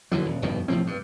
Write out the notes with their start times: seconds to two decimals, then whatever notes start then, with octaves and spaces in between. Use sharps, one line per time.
0.12 D#2 D3 E3 F#3
0.26 D#1
0.42 F1 G2 B2 D#3
0.68 C2 A2 F3 C4
0.87 G2